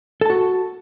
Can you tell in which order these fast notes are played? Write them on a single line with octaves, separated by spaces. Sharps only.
A4 A5 F#4